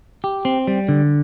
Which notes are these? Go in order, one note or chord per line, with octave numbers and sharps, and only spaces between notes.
G4
C4
G3
D3